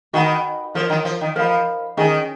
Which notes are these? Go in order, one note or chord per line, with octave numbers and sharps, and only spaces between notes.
D#3 F#4 B4 F#5 B5
F3 F4 A#4 C#5
D#3 F#3
F3
D#3
F3 A#4 F5 B5
D#3 C#4 G#4 D#5 G#5